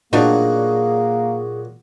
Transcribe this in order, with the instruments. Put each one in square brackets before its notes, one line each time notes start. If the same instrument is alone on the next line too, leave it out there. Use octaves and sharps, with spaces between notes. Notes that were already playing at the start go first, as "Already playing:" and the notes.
[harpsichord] A#2 F#3 F#4 [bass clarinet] A#3 [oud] D4 D#4 [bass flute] G#4